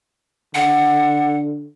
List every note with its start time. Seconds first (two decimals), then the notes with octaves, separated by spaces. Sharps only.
0.55 D3 F#5